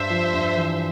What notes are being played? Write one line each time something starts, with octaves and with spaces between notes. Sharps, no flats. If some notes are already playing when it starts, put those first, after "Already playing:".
Already playing: G2 C5 E5
F3
G2
E3